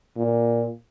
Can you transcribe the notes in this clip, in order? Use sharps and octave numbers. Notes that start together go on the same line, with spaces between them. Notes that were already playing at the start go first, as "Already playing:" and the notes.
A#2